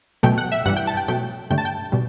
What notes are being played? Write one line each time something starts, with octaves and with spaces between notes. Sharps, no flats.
B2 F#3 A3 G5
F#5
E5
G2 E3 G3 F#5
G5
A5
G5
B2 F#3 A3 G5
G2 D3 A3 G5
A5
G5
B2 G3